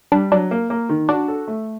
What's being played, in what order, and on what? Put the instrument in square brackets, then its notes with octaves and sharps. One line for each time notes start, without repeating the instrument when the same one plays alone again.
[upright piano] G3 [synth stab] D4
[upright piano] F#3 [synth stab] D4
[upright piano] A#3
A#3
D#3
[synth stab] D4 [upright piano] F#4
[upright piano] A4
A3